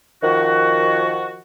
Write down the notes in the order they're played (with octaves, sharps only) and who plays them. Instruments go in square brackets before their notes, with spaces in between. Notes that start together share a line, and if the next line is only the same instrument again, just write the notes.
[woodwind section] D#3 F3 F#4